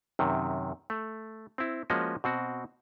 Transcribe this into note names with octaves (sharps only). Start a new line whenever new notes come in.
F#2 C3 D#3
A3
C4 E4
F3 G#3 A#3 C#4 F#4 D#5
B2 C4 F#4